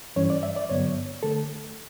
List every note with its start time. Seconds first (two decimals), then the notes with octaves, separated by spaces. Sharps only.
0.16 G2 E3 G3 C#4 C#5
0.30 D5
0.43 E5
0.56 D5
0.70 G2 D3 F#3 B3 C#5
1.23 D3 A3 A4